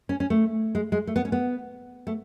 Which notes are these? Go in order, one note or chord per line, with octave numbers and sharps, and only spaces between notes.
C#4
C#4
A3
G#3
G#3
A3
B3
C#4
B3
A3